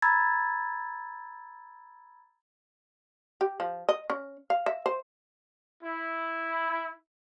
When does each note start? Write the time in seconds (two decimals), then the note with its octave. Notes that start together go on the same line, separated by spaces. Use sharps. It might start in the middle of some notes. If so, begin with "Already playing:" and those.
0.02 A#5 B5 E6 G#6 A6
3.41 G4
3.60 F3
3.89 D#5
4.10 C#4
4.50 F5
4.66 E5
4.86 C5
5.84 E4